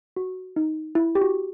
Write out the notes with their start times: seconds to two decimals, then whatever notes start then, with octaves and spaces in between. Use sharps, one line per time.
0.16 F#4
0.56 D#4
0.95 E4
1.15 G4
1.21 F#4